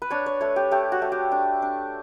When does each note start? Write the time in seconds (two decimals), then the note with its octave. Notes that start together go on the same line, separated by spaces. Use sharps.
0.02 B4
0.10 D4 C#5
0.26 C#5
0.41 A3 C#5
0.56 G4
0.71 A3 G4
0.92 F#4
1.02 A3
1.12 G4
1.32 D4
1.62 D4